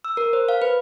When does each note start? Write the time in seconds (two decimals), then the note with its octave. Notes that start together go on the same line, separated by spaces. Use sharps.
0.04 E6
0.17 A#4
0.33 C5
0.49 F5
0.62 B4